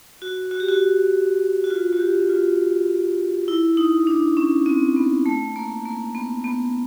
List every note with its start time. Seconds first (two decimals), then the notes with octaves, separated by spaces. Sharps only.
0.22 F#4
0.51 F#4
0.60 G4
0.68 F#4
1.64 F#4
1.70 F4
1.93 F#4
2.00 G4
2.29 F4
3.48 E4
3.77 D#4
4.07 D4
4.37 C#4
4.66 C4
4.96 B3
5.26 A3
5.56 A#3
5.85 A#3
6.15 B3
6.44 B3